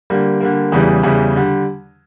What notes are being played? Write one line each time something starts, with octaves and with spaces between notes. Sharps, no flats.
D3 G3 A#3
D3 G3 A#3
E2 C#3 E3 G3
E2 C#3 E3 G3
D3 G3